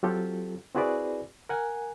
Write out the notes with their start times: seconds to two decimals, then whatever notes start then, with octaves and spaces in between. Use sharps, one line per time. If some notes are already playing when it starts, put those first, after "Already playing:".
0.03 F#3 C4 F4 G4 A4
0.75 C4 E4 F#4 G#4 B4 D5
1.49 A#4 F#5 G#5